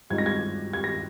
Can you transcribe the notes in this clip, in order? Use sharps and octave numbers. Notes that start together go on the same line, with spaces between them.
G2 F3 G#3 C4 D#4 G#6
A#6
G#6
G#6
A#6